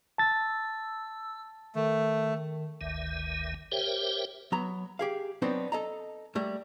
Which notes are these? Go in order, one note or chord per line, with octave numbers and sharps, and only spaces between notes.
A5 E6 A6
D#3 A3
G1 D2 D#3 E5
G4 A#4 C5 C#5 E5 G5
F#3 B3 A#5
G4 G#4 F5
F#3 B3 C4 D4 D#4 C5
A4 D#5 A#5
G3 A3 A#3